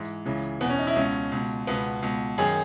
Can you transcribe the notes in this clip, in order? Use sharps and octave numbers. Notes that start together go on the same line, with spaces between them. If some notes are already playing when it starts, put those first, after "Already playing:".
Already playing: G#2 E3
C#2 C#3 E3
E2 B2 B3
C#4
D#4
E4
C#2 B2 C#4
C#2 B2
C#2 B2 B3
C#2 B2
F#2 D#3 G#4